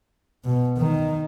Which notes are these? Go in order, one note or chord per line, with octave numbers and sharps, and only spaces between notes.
B2
D#3